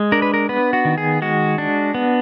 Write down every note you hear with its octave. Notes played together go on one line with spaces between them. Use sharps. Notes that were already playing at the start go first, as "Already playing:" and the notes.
Already playing: G#3
D4 A#4
B4
A#4
B3 B4
F#4
D#3
G#4
G#3 F#4
D4
B3